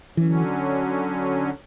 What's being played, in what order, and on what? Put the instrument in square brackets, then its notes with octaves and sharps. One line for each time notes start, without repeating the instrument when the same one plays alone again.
[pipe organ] D3 F#3 C#4 [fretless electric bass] E3